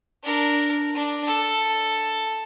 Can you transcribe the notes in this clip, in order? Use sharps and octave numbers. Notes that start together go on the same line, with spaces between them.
D4 A#4
D4
A4